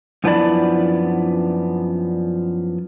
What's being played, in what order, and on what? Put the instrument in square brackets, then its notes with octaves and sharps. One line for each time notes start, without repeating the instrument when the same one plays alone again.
[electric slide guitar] F#2 F3 B3 D4 E4 D5